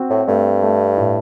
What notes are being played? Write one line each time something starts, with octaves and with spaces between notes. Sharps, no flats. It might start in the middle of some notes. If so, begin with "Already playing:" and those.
Already playing: C4 F#4
A2
G2 A3
A3
A2